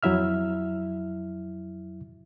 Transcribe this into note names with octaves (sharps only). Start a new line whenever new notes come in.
F2 F#3 E4 E5 F6